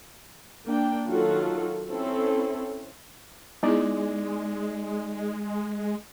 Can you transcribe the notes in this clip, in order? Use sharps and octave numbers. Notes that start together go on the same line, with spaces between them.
A#3 D4 G5
D#3 F#3 F4 F#4 A4
C4 C#4 E4 A4
G#3 B3 D#4 E4 G#4 D5